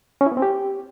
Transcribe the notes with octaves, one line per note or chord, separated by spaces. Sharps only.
C#4
E4
B3
C4
G4